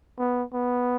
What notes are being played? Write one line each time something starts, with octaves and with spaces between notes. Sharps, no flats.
B3
B3